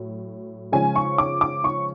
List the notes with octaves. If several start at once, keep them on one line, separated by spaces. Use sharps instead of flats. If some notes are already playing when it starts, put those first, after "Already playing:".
Already playing: A2 F#3
C#3 F3 G#3 C#4 G#5
C#6
D6
D6
C#6